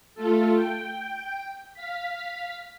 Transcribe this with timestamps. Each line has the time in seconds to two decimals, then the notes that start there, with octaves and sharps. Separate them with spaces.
0.15 A3 F4 A4
0.54 G5
1.74 F5 B6